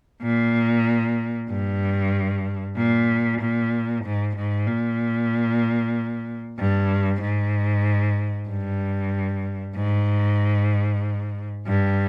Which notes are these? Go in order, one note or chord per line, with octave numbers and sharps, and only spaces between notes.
A#2
G2
A#2
A#2
G#2
G#2
A#2
G2
G#2
G2
G#2
G2